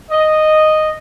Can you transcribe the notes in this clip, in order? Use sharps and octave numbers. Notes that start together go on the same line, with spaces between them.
D#5